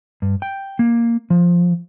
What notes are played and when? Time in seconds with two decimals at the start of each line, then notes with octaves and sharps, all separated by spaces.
0.22 G2
0.42 G5
0.79 A#3
1.30 F3